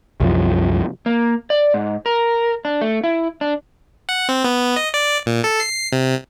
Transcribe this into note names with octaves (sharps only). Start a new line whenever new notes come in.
C2 F#2 F3
A#3
D5
G#2
A#4
D4
A3
E4
D4
F#5
C4
B3
D#5
D5
A#2
A4
C7
C3